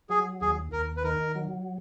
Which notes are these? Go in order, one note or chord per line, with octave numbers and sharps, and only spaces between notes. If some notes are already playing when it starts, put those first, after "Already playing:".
F#3 G#4
D#2 G#4
D#2 A#4
B4
D#3 A#4
F#3